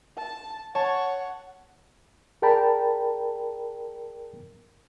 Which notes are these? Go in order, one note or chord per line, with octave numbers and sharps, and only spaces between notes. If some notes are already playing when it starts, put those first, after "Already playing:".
A5
C#5 F#5 A5
G#4 A#4 D5 G5 A5 B5